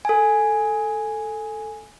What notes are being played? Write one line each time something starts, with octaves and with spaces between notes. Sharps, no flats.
A4 G#5